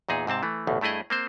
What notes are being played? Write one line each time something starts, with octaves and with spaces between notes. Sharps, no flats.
E2 A#2 D#4 G#4
G#2 C3 C4 A5
E3 A3
A1 D2 B2
G2 A3 E4 G#4 D#5
A#3 C4 C5